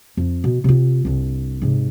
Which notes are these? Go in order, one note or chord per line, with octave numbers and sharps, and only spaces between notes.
F2
B2
C3 F4
C2 G2
G#2 C3